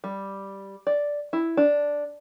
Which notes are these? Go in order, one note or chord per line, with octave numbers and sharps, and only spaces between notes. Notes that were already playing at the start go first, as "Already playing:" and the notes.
G3
D5
E4
D4